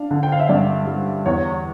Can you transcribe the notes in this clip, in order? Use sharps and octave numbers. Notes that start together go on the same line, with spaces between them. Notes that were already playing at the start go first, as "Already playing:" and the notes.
Already playing: D4 F5
D3
G5
F5
E5
G2 D5
G3
E2 C#5